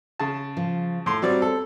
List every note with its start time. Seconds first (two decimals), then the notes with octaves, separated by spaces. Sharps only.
0.20 C#3 A5
0.57 F3
1.06 A2 C6
1.22 F#3 G3 C4 C5 D5
1.42 A4